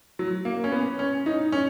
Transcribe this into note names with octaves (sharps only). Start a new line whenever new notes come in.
F#3
A#3
C#4
B3
C#4
D#4
C#4